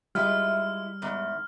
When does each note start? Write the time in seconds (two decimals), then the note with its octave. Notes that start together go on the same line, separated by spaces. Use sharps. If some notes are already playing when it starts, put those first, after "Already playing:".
0.15 G3 G#3 E4 F4 F6
1.02 E2 G#2